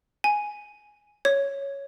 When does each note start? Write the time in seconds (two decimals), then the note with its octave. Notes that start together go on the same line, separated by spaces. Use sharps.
0.24 G#5
1.25 C#5